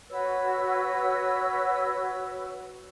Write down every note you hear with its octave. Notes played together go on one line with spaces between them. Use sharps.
F#4 B4 C#5 E6